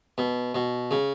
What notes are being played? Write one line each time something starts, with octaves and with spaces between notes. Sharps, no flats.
B2
B2
C#3